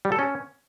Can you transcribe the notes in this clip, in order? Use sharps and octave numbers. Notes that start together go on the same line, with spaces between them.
G3
A4
C#4